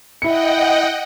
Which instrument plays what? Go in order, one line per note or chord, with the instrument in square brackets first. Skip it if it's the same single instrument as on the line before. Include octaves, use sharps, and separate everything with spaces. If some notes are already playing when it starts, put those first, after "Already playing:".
[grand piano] E4 C#7 [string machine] D#5 F#5 G5